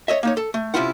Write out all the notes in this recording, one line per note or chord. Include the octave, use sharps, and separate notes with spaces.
C#5 D#5 E5
A#3 D#4 C#5
A4
A3
C3 F3 C#4 E4 F4 F#5